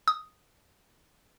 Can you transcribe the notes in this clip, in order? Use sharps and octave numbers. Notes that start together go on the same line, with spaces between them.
D#6